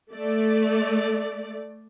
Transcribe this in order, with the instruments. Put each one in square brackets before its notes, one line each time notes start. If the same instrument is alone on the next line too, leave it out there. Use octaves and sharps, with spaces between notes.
[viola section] A3 D5